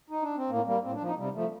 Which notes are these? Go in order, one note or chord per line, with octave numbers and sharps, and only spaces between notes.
D#4
D4
C4
A2 A#3
G3 A#3
A2 C4
D4
F3
D#4
C3 G3
F3 A3